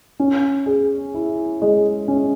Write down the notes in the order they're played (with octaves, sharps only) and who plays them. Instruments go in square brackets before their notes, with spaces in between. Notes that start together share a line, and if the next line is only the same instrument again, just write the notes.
[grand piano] C#4
G#4
E4
G#3
C#4